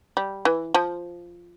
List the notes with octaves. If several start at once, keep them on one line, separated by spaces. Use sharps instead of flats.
G3
E3
F3